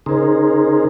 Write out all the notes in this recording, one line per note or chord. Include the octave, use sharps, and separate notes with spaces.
C#3 D#4 G#4 A#4 C5